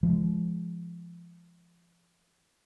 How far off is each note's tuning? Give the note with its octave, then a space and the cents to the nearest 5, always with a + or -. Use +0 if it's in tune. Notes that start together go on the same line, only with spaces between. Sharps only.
F3 -25 G#3 +0